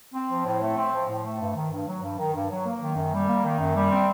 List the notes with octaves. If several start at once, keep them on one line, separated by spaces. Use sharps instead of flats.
C4
F3
A2
A3
C4
F3
A2
A3
G2
D#3
G2
F#3
G2
D#3
G2
F#3
A#3
D#3
F#2
G3
A#3
D#3
F#2
G3
C4